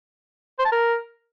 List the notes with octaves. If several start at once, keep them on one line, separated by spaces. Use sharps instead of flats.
C5
A5
A#4